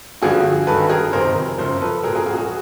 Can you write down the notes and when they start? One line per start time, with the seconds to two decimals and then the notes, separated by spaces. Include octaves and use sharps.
0.22 G2 D3 F3 F#4 G#4
0.67 G2 D#3 A4 B4
0.90 G#4 A#4
1.13 F2 C3 D#3 A#4 C5
1.58 F#2 C#3 F3 A#4 C5
1.81 A4 B4
2.03 F3 G#4 A#4
2.08 A#2
2.15 G#4 A#4
2.26 F#4 G#4
2.38 F#4 G#4